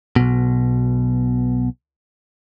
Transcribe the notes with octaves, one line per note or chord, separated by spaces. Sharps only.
B1 B2